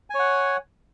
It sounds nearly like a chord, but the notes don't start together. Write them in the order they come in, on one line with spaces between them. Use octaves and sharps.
G#5 C#5 F#5